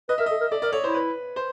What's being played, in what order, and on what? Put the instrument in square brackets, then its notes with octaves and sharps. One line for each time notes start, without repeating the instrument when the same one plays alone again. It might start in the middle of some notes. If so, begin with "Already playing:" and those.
[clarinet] B4 [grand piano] D#5
[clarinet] A#4 [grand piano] E5
[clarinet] A4 [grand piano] D#5
[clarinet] A#4
[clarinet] A4 [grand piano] D5
[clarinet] A#4 [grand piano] D5
[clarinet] A4 [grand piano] C#5
[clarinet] E4 [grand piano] C5
[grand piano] B4
C5